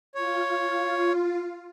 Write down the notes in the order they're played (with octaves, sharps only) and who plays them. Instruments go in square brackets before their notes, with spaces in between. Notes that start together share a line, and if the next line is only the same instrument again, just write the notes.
[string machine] F4 [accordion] C#5